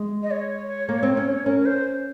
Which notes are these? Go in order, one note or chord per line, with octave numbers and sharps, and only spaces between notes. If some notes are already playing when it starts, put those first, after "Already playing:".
Already playing: G#3
D#5
C#5
A#3
C4
C#4
C#4 A#4
A#4
C5